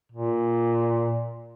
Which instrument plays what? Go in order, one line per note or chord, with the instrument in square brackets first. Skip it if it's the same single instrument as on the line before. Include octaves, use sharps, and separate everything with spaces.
[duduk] A#2